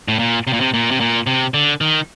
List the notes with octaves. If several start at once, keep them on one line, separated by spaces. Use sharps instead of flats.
A2
A#2
C3
A#2
C3
A#2
C3
A#2
C3
D3
D#3